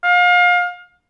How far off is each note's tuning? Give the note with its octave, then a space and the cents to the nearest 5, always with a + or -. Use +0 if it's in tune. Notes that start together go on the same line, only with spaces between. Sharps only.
F5 +30